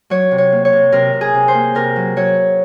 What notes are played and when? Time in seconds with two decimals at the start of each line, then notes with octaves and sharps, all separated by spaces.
0.10 F#3 C#5
0.31 C3
0.38 C#5
0.52 A#3
0.65 C#5
0.73 C3
0.92 C3 A#4
1.14 C3
1.21 G#4
1.34 C3
1.48 C5
1.55 A#3
1.75 C3 A#4
1.96 F#3
2.16 F#3 C#5